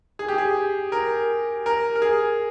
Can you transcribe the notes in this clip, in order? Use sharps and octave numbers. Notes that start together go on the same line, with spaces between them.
G#4
G4
G#4
A#4
A#4
A#4
G#4